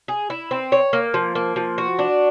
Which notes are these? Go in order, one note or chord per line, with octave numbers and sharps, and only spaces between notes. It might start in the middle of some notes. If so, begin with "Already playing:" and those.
G#4
E4
C4
C#5
A#3
F3
A#3
F3
F#4
D4